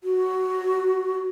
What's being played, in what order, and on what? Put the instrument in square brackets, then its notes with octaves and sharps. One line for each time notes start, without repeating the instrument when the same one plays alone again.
[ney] F#4